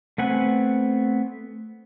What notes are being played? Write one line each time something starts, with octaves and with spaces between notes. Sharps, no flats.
A3 B3 C4 F#5 G#5